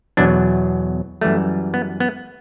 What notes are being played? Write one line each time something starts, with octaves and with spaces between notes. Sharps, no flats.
E2 B2 F#3 D4
F#2 E3 G3 A3
B3
B3